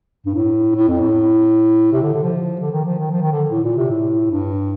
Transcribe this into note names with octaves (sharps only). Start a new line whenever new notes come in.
G2
A2
A2
F2
A2
C3
D3
D3
F3
D3
D#3
F3
D#3
F3
D#3
D3
A2
A#2
C3
A2
G2